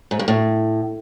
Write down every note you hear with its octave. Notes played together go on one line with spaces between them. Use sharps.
G#2
G2
A2